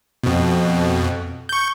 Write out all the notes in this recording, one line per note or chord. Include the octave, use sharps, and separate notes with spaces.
F2 B2
C#6 G6